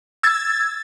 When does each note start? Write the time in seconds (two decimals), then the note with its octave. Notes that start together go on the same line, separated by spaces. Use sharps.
0.23 E6 G#6 A6